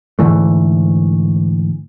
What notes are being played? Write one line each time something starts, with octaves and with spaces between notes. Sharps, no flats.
G#2 D3 E3 A3